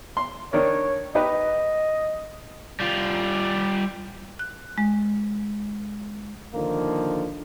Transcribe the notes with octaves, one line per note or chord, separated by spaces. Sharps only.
C6
D#3 D4 A#4 C#5
D#4 G4 B4 D#5
G3 F4
F#6
G#3
D3 D#3 F3 A#3